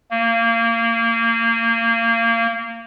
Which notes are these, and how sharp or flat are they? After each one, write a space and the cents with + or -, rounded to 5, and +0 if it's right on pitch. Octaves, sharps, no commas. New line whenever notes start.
A#3 -25